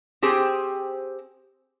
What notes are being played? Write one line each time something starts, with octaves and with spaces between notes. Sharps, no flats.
C4 G4 G#4 C5